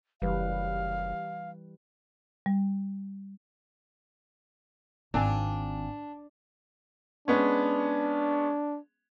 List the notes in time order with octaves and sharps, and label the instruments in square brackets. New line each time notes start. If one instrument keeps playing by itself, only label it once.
[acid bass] F#1 [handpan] E3 G3 B4 [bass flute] F5
[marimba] G3
[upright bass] G#1 [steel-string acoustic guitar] C4 F5 G#5 [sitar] D4
[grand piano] G#3 B3 C#4 [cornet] D4